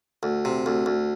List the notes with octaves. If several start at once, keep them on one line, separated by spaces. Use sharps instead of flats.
D2
C3
D2
D2